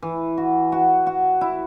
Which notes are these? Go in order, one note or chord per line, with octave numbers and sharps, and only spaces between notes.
E3
F#4
F#4
F#4
E4